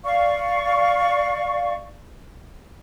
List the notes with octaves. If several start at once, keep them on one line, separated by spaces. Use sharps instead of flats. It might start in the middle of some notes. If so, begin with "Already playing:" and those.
D5 F5 C#6